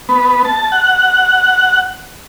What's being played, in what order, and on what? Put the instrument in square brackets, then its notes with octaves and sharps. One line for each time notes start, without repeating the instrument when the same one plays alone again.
[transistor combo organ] B3
A5
F#5